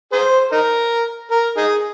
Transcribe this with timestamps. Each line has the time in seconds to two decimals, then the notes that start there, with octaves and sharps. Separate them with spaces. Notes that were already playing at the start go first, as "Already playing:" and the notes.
0.13 G#4 C5
0.52 D#4 A#4
1.31 A#4
1.57 D#4 G#4